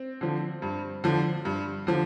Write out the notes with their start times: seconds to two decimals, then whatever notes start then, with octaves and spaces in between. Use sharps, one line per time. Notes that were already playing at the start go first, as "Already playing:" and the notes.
Already playing: C4
0.21 D3 F3
0.62 G2
1.04 D3 F3
1.45 G2
1.87 D3 F3